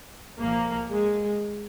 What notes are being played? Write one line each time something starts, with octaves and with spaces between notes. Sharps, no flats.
C2 A#2 F3 A#3
G#3